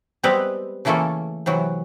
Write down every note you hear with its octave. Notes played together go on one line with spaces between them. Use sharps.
G3 G#3 B3 C4 B4
C#3 E3 A3 A#3 C#4 A4
C3 E3 F#3